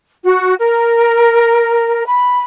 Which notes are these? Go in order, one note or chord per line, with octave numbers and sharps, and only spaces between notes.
F#4
A#4
B5